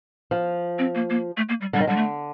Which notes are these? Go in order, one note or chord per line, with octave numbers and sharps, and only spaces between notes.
F3
C4
A#3
A#3
A3
A#3
G3
D3 G3
D#3
D3 G3
A3